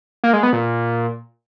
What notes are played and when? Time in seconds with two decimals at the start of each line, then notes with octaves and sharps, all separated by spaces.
0.24 A#3
0.33 G#3
0.43 B3
0.53 A#2